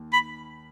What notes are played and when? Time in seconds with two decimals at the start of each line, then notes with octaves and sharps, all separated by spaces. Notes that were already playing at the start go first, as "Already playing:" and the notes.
Already playing: D#2
0.13 B5